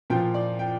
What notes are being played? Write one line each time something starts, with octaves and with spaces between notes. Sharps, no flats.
A#2 F3 G5
D5
G5